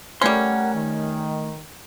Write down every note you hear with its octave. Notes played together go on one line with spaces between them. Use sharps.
G3 A3 C#4 A#4 F#5 C6
D#3